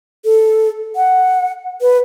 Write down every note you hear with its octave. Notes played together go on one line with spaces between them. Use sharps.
A4
F#5
B4